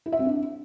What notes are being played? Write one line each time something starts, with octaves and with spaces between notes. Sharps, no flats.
E4
E5
C4
D4